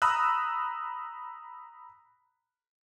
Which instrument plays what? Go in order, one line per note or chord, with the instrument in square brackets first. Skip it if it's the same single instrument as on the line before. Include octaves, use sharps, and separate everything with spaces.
[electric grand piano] A#5 B5 D#6 E6 F#6